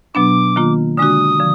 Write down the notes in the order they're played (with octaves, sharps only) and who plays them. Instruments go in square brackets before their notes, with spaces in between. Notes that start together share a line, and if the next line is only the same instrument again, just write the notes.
[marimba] B2 F#3 B3 D4 [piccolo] D6
[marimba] D#3 A#3 F4
[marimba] D3 G#3 D4 F#4 [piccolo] D#6
[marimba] D3 F3